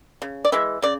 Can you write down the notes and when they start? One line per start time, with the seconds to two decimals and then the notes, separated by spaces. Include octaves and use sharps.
0.22 C#3
0.45 D5
0.52 E3 G#3 E5
0.82 C#3 D5